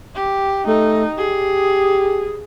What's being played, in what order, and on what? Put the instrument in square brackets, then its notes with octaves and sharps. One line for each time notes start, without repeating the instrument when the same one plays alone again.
[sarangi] G4
[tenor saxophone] A3 [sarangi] D#4
[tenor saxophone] G4 [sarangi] G#4